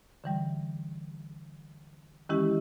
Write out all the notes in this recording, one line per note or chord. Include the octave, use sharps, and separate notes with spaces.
D3 E3 G3
D#3 E3 G#3 C#4 E4 G4